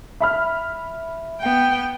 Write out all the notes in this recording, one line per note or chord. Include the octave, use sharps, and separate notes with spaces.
E5 B5 F6
B3 G5